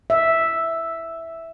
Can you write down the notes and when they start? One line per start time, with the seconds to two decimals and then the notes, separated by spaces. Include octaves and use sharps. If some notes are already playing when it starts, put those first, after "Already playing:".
0.10 E5